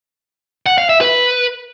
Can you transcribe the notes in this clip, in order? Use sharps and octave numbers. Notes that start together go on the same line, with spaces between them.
F#5
F5
E5
B4